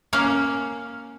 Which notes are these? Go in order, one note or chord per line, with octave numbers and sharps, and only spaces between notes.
A#3 C#4 F5